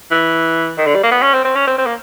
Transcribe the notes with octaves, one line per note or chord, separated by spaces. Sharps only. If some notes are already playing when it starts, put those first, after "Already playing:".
E3
D#3
D3
G3
A#3
B3
C#4
C4
C4
C#4
C4
C4
A#3